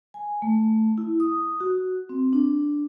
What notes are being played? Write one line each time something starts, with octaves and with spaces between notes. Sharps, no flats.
G#5
A3
E4
D#6
F#4
C4
D4